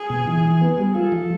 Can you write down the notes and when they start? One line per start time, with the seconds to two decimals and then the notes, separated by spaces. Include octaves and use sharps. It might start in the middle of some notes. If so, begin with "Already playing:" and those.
Already playing: G#4
0.10 B2
0.27 E3
0.45 E3
0.61 B3
0.78 G3
0.95 F4 A4
1.12 F3